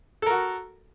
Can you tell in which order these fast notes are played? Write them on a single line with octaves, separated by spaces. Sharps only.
A4 A#4 F#4